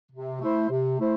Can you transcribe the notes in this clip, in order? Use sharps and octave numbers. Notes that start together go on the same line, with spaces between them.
C3
A3 E4 C5
C3
A3 E4 C5